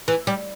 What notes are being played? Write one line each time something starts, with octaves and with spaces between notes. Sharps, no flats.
E3
G3